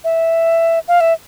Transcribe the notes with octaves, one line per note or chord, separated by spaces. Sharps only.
E5
F5
E5